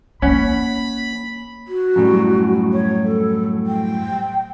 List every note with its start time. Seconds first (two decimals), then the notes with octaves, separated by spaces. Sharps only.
0.22 A#3 C#4 F#5 B5
1.66 F#4
1.96 F#2 A2 G3
2.73 C#5
3.03 A4
3.66 G5